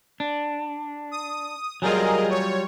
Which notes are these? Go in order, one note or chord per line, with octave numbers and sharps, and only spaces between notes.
D4
D#6
F#3 G3 F4 G#4 A#4 D#5
C#5